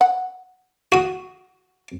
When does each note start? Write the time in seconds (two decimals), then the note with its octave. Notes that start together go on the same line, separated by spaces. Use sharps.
0.01 F#5
0.92 F#4 D#6